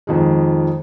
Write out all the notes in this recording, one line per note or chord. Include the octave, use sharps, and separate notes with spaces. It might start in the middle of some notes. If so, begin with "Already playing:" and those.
F2 D#3 G#3